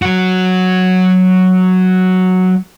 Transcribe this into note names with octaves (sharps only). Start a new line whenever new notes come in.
F#3 F#4